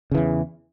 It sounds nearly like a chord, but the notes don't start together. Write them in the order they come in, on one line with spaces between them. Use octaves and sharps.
C#3 E3 E2